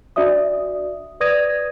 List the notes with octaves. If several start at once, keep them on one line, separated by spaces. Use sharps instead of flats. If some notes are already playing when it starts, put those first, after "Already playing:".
D4 F#4 D5 E5 D#6
B4 D5 D#6 G#6 A#6 D#7